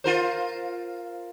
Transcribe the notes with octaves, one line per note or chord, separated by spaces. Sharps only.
F4 A#4 C5